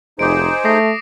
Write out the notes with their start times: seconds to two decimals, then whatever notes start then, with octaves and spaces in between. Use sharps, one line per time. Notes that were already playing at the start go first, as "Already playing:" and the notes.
0.19 F1 D#4 G#4 C5 D6 D7
0.65 A3 D#6 A#6 C7